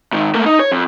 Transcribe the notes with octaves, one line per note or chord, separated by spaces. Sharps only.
G#2 D#3
A3 A#3
D#4
C#5
F2